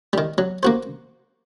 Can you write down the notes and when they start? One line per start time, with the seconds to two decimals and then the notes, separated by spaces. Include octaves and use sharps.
0.13 D#3 G3
0.38 F#3
0.63 A#3 F#4 C5